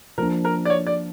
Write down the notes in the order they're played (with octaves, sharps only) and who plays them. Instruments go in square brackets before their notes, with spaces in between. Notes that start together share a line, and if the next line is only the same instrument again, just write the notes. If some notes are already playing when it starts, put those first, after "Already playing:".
[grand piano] F3 A#3 D4 [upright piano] A#4
[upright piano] A#4
D5
C#5
D5